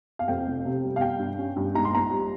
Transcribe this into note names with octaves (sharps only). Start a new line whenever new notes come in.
F5
F2 G5
F1
C3
G3
F5
G3 G5
G2
C#4
G2
G#2 A#5
C6
A#1 A#5
G3